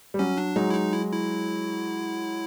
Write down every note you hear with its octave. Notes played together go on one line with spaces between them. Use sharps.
G3
F#3 C#4
D4
F#3 G#3 D#4
E4
D#4
E4
E4